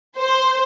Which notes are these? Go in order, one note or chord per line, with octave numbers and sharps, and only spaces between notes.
C5